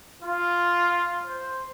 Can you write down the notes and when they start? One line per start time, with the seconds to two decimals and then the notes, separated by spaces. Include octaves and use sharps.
0.22 F4
1.26 C5